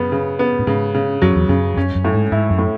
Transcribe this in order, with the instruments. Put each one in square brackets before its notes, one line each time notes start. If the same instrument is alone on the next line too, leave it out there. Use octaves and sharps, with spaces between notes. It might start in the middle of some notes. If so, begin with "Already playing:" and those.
Already playing: [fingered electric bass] F#2 [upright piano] C#3 B3
[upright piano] C#3
B3
[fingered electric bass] A2
[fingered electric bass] G#2 [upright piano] C#3
[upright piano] C#3
[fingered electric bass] F#2 [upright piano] F#3
[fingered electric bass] E2
[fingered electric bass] F#2 [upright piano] C#3
[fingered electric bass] F#2 [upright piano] C#4
[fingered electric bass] F#2
[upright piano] A2
[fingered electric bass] G#2
[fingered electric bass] G#2 [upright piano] E4
[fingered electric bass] F#2
[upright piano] A2